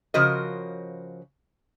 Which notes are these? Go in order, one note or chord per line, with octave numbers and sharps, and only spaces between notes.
C#3 F3 F#4 A#4 C5 D#5